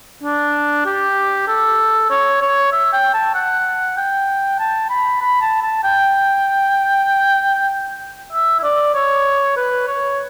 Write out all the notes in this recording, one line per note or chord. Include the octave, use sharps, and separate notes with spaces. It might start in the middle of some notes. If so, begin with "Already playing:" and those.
D4
G4
A4
C#5
C#5
E5
G5
A5
F#5
G5
A5
B5
B5
A5
A5
G5
E5
E5
D5
C#5
B4
C#5